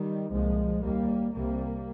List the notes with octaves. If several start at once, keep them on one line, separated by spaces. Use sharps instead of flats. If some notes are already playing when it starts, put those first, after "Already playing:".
Already playing: D#3 G3
C2 A#2 F3 G#3
D#2 G3 A#3
C2 C3 G3 A#3